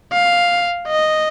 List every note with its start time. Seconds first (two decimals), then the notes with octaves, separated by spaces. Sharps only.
0.12 F5
0.88 D#5